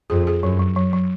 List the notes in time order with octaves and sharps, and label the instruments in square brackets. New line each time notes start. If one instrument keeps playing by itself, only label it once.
[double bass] F2 [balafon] G#4
[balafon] G#4
[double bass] F#2 [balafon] F#3
[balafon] F#3
F#3
F#3